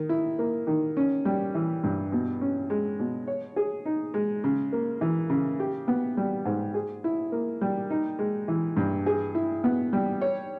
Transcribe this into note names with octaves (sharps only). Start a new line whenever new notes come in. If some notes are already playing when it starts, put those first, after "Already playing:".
Already playing: D#3
E4
A#3
D#3
C#4
G3
E3
G2
B2
C#4
G#3
B2
C#5
G#4
D#4
G#3
C#3
A#3
E3
C#3
G4
B3
G3
G#2
G#4
E4
A#3
G3
D#4
G#3
E3
G2
G#4
E4
B3
G3
C#5